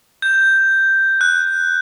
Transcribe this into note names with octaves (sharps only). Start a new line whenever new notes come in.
G6
F#6